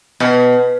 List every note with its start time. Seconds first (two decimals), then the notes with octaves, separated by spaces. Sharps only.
0.20 B2